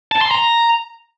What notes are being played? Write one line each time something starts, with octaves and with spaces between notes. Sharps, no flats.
A5
C6
A#5